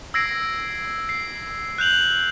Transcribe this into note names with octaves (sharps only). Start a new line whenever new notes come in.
E6 G#6 A#6 C7 D7
C7
F#6 G6 F7 F#7